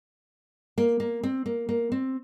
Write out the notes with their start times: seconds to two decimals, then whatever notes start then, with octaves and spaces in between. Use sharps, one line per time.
0.78 A#3
1.00 A#3
1.23 C4
1.46 A#3
1.69 A#3
1.92 C4